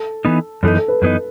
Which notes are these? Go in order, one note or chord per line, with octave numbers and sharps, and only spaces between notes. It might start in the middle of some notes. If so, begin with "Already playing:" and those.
Already playing: A4
E3 B3 D#4
F#2 E3 B3 D#4 A4
A4
B4
F#2 E3 B3 D#4